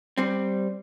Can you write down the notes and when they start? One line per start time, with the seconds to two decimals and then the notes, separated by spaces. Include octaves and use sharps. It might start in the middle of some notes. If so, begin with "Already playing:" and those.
0.18 G3 C4